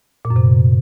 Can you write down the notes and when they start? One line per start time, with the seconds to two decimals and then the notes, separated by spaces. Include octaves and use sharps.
0.25 A#2
0.30 F#2
0.36 C3